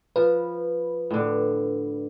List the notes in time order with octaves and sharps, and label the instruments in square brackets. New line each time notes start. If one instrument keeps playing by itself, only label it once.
[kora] F3 [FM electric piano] B4
[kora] A2 D3